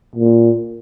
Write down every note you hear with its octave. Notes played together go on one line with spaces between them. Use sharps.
A#2